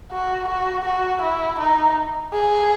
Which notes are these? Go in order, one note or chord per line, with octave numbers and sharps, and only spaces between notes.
F#4
F#4
F#4
E4
D#4
G#4